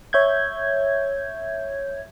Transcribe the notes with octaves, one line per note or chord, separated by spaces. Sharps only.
C#5 E5 G6 G#6